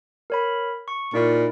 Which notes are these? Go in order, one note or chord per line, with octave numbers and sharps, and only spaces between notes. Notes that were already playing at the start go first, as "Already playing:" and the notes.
A#4 C#5 B5
C#6
A#2 D#4 E4